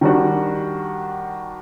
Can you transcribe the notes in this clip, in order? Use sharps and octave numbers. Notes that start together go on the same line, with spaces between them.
D#3 G3 D4 F#4